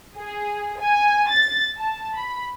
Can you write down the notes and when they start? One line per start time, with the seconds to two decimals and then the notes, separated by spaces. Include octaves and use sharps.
0.17 G#4
0.80 G#5
1.30 A6
1.79 A5
2.15 B5